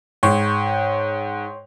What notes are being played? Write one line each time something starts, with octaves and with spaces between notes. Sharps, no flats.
G#2 C#5 G5 C6